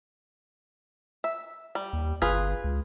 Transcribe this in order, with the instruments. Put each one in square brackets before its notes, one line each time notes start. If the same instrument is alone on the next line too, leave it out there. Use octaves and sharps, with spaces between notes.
[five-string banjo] E5
G3
[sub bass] D#2
[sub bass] G1 [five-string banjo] F4 G#4 B4
[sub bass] C#2